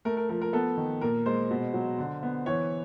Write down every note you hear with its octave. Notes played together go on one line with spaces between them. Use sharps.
A3 A#4
A#4
F3 A#4
A#4
B3 A4
D#3
A#2 A#4
G#3 C5
B2
F#3
D3
B3
E3 C#5